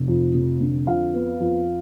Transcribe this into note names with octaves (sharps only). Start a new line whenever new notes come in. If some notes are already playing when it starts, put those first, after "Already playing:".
Already playing: F1
F2
F1
D3
F2 F5
B3
F2